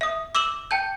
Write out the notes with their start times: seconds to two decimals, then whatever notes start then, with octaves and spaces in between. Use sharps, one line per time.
0.01 E5 D#6
0.35 D6 E6 E7 F#7
0.71 G5 A5 G6